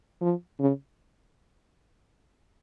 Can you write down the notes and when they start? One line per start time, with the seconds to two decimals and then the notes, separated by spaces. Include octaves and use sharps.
0.21 F3
0.59 C#3